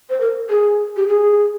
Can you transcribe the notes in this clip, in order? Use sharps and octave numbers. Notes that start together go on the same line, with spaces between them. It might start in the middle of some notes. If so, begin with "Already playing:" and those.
C5
A#4
G#4
G4
G#4